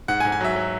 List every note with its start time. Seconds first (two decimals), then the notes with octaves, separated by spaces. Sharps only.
0.08 G#2 F#5
0.20 G#5
0.25 G#2
0.32 G#5
0.41 F#3 E5
0.56 F#3